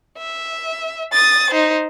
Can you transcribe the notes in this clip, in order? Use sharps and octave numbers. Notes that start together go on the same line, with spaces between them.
E5
D#6 A6
D#4 C5